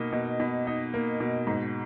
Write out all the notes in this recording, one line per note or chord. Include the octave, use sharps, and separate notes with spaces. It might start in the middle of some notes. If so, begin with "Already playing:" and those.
Already playing: B2 A#3 D#4
B2
B2
D#4
A#3
B2
G#2